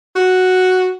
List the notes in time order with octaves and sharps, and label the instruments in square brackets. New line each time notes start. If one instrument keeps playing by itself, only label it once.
[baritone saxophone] F#4